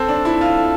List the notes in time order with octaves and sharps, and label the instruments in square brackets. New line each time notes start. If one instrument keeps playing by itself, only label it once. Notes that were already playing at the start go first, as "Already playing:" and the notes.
Already playing: [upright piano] C4 [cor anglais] A4
[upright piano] D4
E4
F4